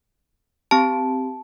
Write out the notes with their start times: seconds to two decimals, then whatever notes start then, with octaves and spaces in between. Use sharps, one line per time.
0.71 C4 G4 A5